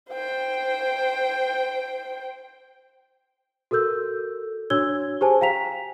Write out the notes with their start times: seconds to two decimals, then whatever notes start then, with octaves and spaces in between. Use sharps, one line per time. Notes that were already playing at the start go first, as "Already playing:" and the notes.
0.11 C5 G5
3.71 F#4 A4 A#4 E6 G6
4.70 D4 F#4 C#5 E6 G#6 G7
5.21 G4 G#4 C5 G#5 A5
5.41 F5 G5 A#5 B6 F7